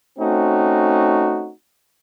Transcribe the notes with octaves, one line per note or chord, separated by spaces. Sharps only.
A3 C4 C#4 D#4 F#4